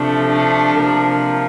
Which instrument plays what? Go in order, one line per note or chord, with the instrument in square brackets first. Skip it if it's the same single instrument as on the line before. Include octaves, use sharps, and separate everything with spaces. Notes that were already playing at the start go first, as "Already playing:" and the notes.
Already playing: [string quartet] C3 F3 A3 D4
D4
C3 F3 A#3